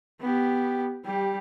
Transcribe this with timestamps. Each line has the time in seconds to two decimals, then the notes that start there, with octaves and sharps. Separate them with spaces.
0.21 B3 G4
1.05 G3 G4